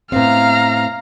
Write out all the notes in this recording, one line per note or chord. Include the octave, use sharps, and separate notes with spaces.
A2 B3 C4 F5 A#5